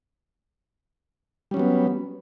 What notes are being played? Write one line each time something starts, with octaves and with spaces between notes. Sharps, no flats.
F#3 G3 B3 C#4